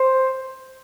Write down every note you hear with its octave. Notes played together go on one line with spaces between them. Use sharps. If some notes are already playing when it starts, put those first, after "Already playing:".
Already playing: C5